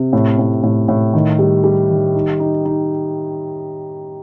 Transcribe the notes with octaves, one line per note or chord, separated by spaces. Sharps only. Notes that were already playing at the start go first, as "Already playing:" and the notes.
Already playing: C3
A2
A2
A2
A2
D#3
G3
G3
D#3
D#4
D#4
D#4